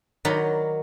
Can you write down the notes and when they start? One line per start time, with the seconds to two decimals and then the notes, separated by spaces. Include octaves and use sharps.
0.25 D#3 F#3 D5 F#5 A#5 B5